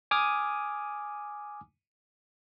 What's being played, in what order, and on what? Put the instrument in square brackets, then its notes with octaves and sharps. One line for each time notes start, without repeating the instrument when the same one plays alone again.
[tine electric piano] G#5 D6 D#6 F6